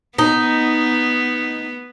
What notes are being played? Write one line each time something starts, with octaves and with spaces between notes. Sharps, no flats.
B3 D#4